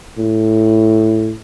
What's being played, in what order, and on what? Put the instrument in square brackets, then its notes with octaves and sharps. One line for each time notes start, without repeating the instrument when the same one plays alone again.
[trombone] A2